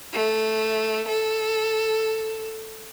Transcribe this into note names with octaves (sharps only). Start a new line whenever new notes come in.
A3
A4